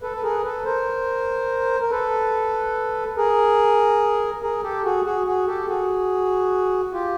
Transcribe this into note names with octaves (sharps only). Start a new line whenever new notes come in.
A4 B4
B4
G#4 A#4
A4 B4
A#4 C5
A#4
A4 B4
G#4 A#4
G#4 A#4
G4 A4
F#4 G#4
F#4 G#4
F#4 G#4
G4 A4
F#4 G#4
F4 G4